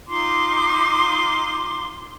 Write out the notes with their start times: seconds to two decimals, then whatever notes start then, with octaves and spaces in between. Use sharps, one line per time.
0.08 D#4 F4 C6 D6